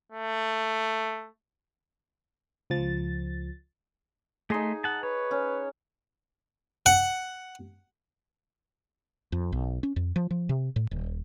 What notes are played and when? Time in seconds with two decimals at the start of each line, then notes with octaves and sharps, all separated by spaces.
0.12 A3
2.70 C#2 F3 A6
4.50 A3 D#4 G#4 D#5 C6
4.84 F#5 A5
5.03 B4 C#5
5.31 C#4
6.86 F#5
9.32 F2
9.52 B1
9.83 C#4
9.96 F2
10.16 F3
10.31 F3
10.49 C3
10.76 A2
10.91 D#1